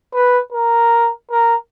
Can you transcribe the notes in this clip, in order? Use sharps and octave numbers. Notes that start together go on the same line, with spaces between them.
B4
A#4
A#4